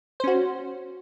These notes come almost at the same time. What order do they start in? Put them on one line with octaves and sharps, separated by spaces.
C5 C#4 F#4